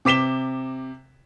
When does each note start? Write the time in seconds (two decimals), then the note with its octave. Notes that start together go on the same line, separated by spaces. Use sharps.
0.05 C3 D6 B6 E7 G7